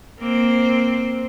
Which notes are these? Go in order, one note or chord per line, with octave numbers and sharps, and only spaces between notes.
A#3 C4 C5